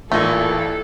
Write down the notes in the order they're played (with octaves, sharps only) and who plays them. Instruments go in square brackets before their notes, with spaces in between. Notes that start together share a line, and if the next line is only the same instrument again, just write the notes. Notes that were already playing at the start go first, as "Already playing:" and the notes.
[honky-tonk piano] A1 E3 [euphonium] A#2 [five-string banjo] G#3 A3 [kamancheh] A4